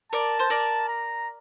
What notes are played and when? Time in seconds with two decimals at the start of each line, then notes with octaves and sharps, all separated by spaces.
0.12 A#4 D5 A5
0.39 C5
0.50 A#4 D5
0.88 A#5